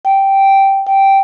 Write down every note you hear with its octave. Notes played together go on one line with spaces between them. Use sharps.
G5
G5